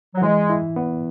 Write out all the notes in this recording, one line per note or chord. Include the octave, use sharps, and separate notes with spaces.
F#3
E3 G#3
E4
B3